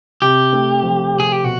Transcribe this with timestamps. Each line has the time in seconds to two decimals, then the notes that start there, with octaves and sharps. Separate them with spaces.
0.22 C3 G4
0.53 A3
0.83 F3
1.13 C3
1.20 G#4
1.32 G4
1.44 B2 F#4